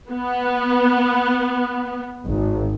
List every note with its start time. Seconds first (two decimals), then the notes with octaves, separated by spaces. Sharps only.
0.11 B3
2.26 G#1